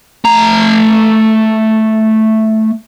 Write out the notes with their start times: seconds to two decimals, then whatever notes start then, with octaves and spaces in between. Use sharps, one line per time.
0.25 A3 A#5